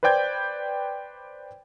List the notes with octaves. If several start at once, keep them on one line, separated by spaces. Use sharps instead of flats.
B4 C5 D5 G5 G6 G#6